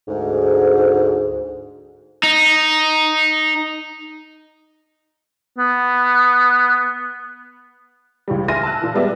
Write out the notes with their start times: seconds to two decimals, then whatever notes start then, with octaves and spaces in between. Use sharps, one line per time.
0.08 D2 G#2
2.23 D#4
5.58 B3
8.28 C#2 A2 E3 G3
8.48 E5 G#5 C6 F6 A#6 D#7
8.63 A5 E6 F#6
8.82 A#2 E3
8.95 G3 G#3 B3 D5 E5